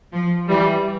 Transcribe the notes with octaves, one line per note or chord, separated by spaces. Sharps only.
F3
E3 G3